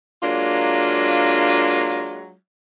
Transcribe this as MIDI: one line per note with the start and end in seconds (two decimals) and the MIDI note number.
0.22 2.32 54
0.22 2.32 56
0.22 2.32 58
0.22 2.32 62
0.22 2.32 65